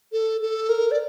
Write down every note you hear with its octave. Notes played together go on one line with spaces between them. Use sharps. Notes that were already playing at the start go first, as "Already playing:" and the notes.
A4
A4
A#4
D5